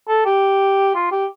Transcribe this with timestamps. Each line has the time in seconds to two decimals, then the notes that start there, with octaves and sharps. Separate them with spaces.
0.08 A4
0.25 G4
0.95 F4
1.11 G4